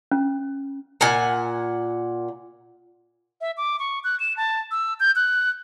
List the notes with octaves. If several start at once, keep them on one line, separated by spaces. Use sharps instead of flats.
C#4
A#2 F#5 G#5
E5
D6
C#6
F#6
E7
A5
E6
G6
F#6